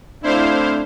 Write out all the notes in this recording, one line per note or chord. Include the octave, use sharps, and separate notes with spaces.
A3 C4 D4 E4 C5 F5